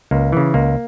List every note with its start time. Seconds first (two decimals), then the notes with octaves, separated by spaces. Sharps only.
0.11 C#2 A#3
0.32 C#3 E3
0.54 C#2 A#3